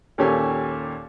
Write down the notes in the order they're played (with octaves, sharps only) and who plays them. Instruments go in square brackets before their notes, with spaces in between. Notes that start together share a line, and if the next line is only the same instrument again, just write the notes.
[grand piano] D#2 A#2 C#4 G4 A4 G#5